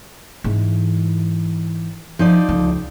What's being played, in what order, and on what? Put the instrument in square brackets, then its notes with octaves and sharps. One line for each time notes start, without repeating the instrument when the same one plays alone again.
[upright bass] G#2 E3
[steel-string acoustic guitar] F3 D#4 D5
[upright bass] C#2